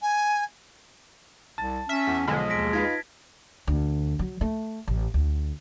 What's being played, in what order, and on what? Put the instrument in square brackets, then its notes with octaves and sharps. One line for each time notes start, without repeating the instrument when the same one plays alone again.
[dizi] G#5
[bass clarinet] C2 [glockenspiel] A5 [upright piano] A6
[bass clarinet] C#4 [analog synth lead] E5 [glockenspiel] F6 B6
[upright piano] E2
[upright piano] B1 F3 [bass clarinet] D3 [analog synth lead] G#3
[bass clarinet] D#2 [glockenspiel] A#6 B6 D7
[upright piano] D#4 F4 B4 [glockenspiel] G#6 B6
[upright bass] D2
F#3
A3
A1
D2